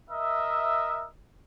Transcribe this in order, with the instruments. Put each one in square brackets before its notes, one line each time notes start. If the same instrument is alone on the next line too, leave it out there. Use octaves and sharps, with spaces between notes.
[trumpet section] A#4 D#5 E5